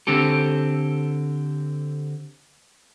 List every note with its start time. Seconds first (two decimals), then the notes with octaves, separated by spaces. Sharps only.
0.07 D3 C4 G4 A4